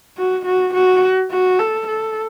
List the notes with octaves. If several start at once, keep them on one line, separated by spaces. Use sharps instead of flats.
F#4
F#4
F#4
F#4
A4
A4